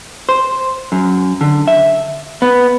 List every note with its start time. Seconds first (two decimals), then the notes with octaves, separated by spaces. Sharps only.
0.29 C5
0.92 F#2
1.41 D3
1.68 E5
2.42 B3